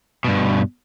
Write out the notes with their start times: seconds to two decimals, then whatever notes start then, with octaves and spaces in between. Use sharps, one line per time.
0.25 G2 B2